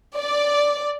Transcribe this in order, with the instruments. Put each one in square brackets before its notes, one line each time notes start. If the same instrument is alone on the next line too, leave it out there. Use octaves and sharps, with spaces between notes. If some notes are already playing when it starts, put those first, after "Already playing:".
[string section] D5